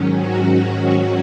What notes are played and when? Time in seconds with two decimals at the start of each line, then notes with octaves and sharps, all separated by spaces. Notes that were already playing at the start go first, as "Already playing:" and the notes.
Already playing: G#2 D#3 F#3 C#4
0.18 C#4 F#4